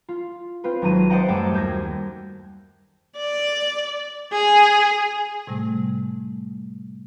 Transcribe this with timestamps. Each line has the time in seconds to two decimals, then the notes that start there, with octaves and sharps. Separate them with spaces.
0.09 F4
0.64 C4 F4 B4
0.82 G#1 F#3 D#4 A#5 D#7
1.10 C5 D5 D#5 F#5 G5 A#5
1.28 F#2 G3 A3 A4 G5 A5
1.54 D#2 G6 G#6 A#6
3.17 D5
4.32 G#4
5.47 A2 C3 G3 A3